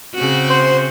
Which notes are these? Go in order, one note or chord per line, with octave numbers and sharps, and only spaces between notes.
C#3 C4 F#4
C5